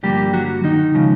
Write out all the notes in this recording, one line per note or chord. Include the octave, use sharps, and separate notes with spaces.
G2 D3 F3 G3 A#3 G4
F#3 F#4
D#3 D#4
C#3 F3 G#3